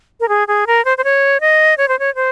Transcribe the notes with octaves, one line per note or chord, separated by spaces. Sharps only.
A#4
G#4
G#4
A#4
C5
C5
C#5
D#5
C#5
C5
C#5
C5